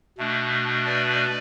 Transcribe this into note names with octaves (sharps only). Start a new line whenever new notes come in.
B2 A3 D4
B4 D5